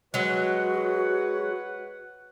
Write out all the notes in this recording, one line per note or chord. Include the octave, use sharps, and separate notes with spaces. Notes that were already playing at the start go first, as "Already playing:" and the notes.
F#3 G#3 F#4 B4 C#5 F#5